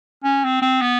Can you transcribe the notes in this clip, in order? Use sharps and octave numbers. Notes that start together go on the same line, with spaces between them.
C#4
C4
C4
B3